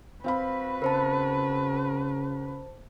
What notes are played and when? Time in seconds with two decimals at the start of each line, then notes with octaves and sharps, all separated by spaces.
0.24 C4 F#4 B4 F5 B5
0.82 C#3 A#4 C5 A5